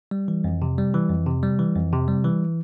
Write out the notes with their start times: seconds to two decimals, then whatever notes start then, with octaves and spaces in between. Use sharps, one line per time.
0.11 G3
0.28 E3
0.44 F2
0.62 C3
0.78 G3
0.94 E3
1.10 F2
1.27 C3
1.43 G3
1.59 E3
1.76 F2
1.93 C3
2.08 G3
2.25 E3